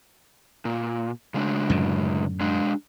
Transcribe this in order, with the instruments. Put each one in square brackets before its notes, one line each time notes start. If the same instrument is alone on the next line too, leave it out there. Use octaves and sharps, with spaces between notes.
[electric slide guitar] A#2
C#3 G#3 D4
[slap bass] F#2 A2 D3
[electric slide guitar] G#3 D4